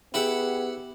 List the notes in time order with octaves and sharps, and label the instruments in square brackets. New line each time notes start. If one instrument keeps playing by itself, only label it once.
[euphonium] B3 [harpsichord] E4 E5 F#5 [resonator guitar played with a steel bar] G4 [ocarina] G#4